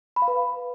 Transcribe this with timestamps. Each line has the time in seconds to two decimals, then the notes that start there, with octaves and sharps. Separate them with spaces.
0.16 B5
0.22 F5
0.28 B4